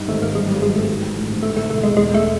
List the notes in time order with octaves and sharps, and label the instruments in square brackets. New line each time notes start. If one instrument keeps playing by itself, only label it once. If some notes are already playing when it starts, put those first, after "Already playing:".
Already playing: [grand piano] G2 D#4
[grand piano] G#1 [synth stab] A3
[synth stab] A#3
[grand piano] G2 [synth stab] G#3
[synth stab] G3
[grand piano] F#3 [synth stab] G#3
[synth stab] A3
[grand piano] G#2
A1
[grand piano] D2 [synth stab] A3
[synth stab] A3
[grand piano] E1 [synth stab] A3
[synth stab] G#3
[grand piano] E2 [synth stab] G#3
[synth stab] A3